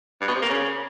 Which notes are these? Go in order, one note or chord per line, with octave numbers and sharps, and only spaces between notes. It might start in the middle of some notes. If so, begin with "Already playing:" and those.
G2
B2
C3
A#3
C#3